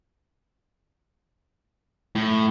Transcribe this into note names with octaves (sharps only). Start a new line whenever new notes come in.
A2